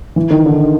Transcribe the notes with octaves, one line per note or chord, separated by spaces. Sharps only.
E3
D#3
D3